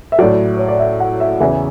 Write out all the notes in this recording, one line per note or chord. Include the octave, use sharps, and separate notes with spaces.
E5
A2 F#3 D5
C#5
D5
E5
F#5
E5
E2 C#3 E3 E5